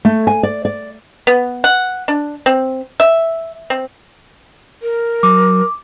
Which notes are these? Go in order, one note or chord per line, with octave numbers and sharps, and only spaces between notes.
A3
G#5
D5
D5
B3
F#5
D4
C4
E5
C4
A#4
F#3 D6